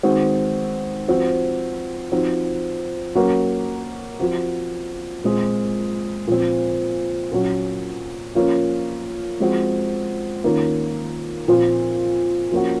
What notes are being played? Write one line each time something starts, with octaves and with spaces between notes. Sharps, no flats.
D#3 G#3 C4 F#4
F3 C4 F#4
F3 C4 D#4 F#4
F#3 A#3 C#4 F#4
F3 C4 F#4
A#2 G#3 C4
A#2 F3 C4
A#2 F#3 C#4 F#4
F3 A#3 C#4 F4
F3 G#3 C4 F#4
D#3 A#3 C#4 F4
A#2 F3 C4 F4
F3 A#3 C#4 F#4